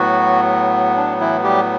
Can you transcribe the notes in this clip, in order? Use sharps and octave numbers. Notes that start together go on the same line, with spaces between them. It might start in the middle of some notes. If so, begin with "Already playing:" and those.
Already playing: A2 F#3 B3 F#4
D4
E3 E4
G3 G4